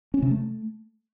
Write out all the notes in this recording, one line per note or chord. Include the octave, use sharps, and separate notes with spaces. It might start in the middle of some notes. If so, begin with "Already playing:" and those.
C#4
C3
A3